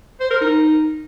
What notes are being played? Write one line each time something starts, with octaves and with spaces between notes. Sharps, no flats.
C5
A#4
D#4